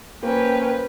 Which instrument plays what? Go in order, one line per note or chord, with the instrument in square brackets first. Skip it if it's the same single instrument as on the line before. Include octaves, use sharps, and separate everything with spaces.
[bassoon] F3 [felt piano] A#3 [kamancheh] C#4 G5 [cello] B4